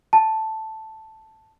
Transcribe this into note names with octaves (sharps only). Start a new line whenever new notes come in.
A5